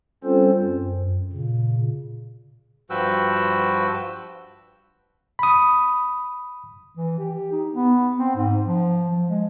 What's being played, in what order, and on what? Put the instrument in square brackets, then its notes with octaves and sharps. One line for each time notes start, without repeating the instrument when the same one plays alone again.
[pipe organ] G3 C4 C#4 F4 A4 C5
F#2
A#2 C#3
[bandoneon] G2 F3 F#4 B4 G5 E6
[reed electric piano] B5 D#6
[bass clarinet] E3
G4
D#4
B3
C4
G#2
F3
F3
G#3